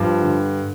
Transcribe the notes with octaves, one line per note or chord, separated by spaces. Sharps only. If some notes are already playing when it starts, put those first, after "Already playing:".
Already playing: G2 F3
D3